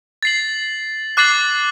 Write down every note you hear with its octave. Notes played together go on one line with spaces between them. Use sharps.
A6 C7 F#7
D6 F#6 A6 C7 F#7